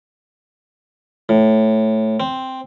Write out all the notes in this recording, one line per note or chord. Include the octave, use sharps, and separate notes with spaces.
A2
C4